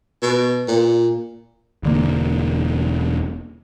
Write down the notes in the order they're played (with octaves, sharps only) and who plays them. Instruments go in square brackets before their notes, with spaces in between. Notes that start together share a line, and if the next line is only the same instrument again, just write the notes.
[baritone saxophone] B2
A#2
[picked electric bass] E1 D3 A#3